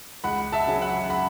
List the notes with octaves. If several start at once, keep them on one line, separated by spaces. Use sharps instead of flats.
C#2 F#5 B5
E5 A5
C#3 F#3 C#4
F#5 B5
F#5 B5